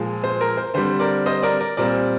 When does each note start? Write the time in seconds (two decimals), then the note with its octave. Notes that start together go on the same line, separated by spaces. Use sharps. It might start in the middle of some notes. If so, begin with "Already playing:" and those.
Already playing: A#2 F3 G#3
0.24 C5
0.41 A#4
0.57 C5
0.74 D3 G3 C4 C5
1.00 A#4 D5
1.26 C5 D#5
1.43 A#4 D5
1.60 A#4 D5
1.77 A#2 G3 C4 A#4 D5